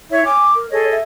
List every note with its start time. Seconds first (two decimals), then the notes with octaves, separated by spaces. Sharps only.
0.11 E4 C#5 E5
0.25 G#5 D6
0.56 A#4
0.71 G#4 A4 C#5 D#5
0.92 E5